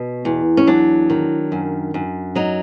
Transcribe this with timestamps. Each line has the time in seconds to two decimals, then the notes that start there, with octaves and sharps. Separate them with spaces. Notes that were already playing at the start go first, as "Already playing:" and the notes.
Already playing: B2
0.25 E2
0.57 C#4
0.67 F#3 D4
1.10 D#3
1.52 F#2
1.94 F#2
2.35 F#3 D#4